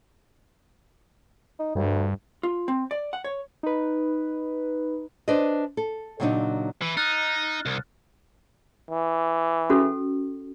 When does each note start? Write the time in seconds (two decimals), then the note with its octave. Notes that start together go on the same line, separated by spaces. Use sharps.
1.59 D#4
1.75 D2 G2
2.43 F4
2.68 C4
2.91 D5
3.13 F#5
3.24 C#5
3.63 D#4 B4
5.28 D4 B4 C5 D5 D#5
5.77 A4
6.20 A#2 C#3 F#3 C4 D4 D#4
6.82 E3
6.97 D#4 F6 F#6 A6
7.66 C2
8.91 E3
9.70 C#4 F#4 A4